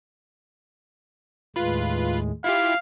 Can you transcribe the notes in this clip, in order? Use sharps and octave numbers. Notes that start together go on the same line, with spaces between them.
D#2 A2 G#3 F4 B4
E4 F4 G4 F5